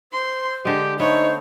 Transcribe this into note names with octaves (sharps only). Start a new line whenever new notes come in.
C5 C6
D3 G#3 G4
A3 B3 D#4 C5 C#5